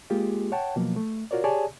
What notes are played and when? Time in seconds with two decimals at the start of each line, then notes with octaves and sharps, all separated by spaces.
0.10 G#3 A#3 F4 G4 G#4
0.52 C#5 F#5 G5 A5
0.76 B2 F3 F#3 A#3
0.96 A3
1.31 F4 F#4 A#4 C#5 D5
1.44 G4 G#4 C#5 D5 G#5 A5